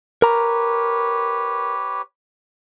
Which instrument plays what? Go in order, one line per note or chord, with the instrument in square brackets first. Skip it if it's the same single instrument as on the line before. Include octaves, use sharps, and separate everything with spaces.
[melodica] G4 B4 C#5 [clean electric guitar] A#4 A#5